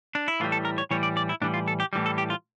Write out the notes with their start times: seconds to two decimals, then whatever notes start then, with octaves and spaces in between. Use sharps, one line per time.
0.15 D4
0.28 E4
0.40 A2 E3 G3 F4
0.52 A4
0.65 A#4
0.78 C#5
0.91 A2 E3 G3 C#5
1.03 D5
1.17 D5
1.29 E4
1.41 A2 E3 G3 D4
1.54 F4
1.68 A4
1.80 G4
1.93 A2 E3 G3
2.06 A4
2.18 G4
2.30 F4